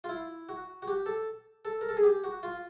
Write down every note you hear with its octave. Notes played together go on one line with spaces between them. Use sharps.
F4
E4
F#4
F#4
G4
A4
A4
A#4
A4
G#4
G4
F#4
F4